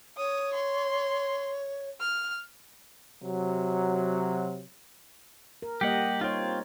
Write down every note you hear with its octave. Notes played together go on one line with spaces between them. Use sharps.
C#5 D#6
C6
F6
C3 F#3
A#4
G3 A#3 G4 D#5 F#5
C4 D#4 F4 C5 C#5